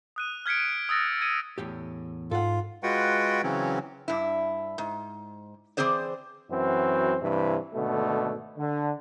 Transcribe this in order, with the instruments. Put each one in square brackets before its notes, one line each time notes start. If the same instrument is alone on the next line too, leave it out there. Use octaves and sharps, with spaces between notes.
[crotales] D#6 F#6 D#7
F6 G#6 B6 C#7 D7
D#7
D#6 E6 A6 A#6
G#6 C#7 D#7
[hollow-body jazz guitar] E2 A2 G4
[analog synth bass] G#2 [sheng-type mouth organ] F4 [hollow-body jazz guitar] A4 F#5
[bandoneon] G#3 F4 F#4 B4 F#5 G5
C#3 E3 F#3 C4 C#4
[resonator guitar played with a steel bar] G2 E4
G#2
E3 G#3 C4 G#4 C5 D5
[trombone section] F#2 E3 C4 F#4
G2 C3 E3
G#1 B2 D3 A3
D3